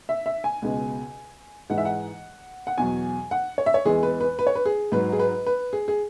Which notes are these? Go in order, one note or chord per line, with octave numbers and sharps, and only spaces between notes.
E5
E5
G#5
C#2 B2 G#3
G#2 E3 G#3 F#5
E5
F#5
F#5
E2 B2 F#3 G#5
F#5
C#5
E5
C#5
E2 E3 G#3 G#4
B4
B4
B4
C#5
B4
G#4
G#2 F#3 B4
G#4
B4
B4
G#4
G#4